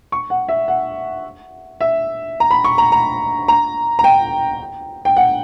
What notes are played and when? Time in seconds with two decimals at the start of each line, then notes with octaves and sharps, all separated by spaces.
0.12 C#6
0.30 F#5
0.49 E5
0.68 F#5
1.81 E5
2.40 A#5
2.51 B5
2.64 C#6
2.78 A#5
2.92 A#5
3.48 A#5
3.99 A#5
4.04 G5
5.05 G5
5.17 F#5